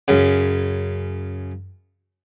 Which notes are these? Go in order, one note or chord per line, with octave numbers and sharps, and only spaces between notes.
F#2 C#3